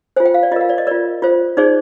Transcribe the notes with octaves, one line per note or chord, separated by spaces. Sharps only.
F4 C5 G#5
G5
F5
D5
F4 A#4 D#5 F5
D5
D#5
F4 A#4 D5
F4 C5
D#4 G#4 C5 D5